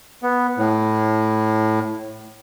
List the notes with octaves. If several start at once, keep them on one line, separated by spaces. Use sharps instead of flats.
B3
A2